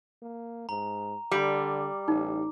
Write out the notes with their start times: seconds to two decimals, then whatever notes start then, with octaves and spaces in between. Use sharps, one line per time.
0.22 A#3
0.69 G#2 A#5
1.32 D3 G3 D6
2.08 A1 D#4